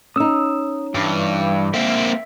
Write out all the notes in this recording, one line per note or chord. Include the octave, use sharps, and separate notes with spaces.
C#4 D#4 D#6 E6
G2 E3
A#3 C4 E5